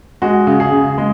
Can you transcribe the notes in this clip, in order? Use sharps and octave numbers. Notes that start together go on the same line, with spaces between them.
G#3 F#4
C#3
G#4
C#3
G#3